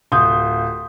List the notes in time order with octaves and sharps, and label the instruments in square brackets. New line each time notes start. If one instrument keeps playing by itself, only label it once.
[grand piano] D1 G6 [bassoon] F4 [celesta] C6 D#6